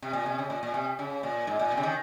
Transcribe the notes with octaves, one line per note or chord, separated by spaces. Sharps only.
C3
A#2
C3
C#3
A#2
A#2
C3
C#3
A#2
G#2
A#2
C3
C#3
D#3